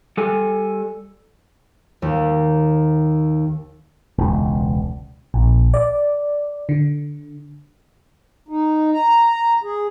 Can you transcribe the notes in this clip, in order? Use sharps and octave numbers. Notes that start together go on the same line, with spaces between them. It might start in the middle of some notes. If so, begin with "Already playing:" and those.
G3 A4 G#5
D#2
E1 C#2
A#1
D5
D3
D#4
A#5
G#4